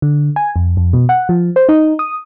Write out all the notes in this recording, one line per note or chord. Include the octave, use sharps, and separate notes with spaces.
D3
G#5
F2
F2
B2
F#5
F3
C5
D#4
D#6